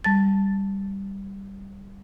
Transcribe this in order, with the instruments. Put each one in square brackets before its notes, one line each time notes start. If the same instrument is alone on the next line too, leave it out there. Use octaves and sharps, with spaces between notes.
[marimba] G3 A5 A6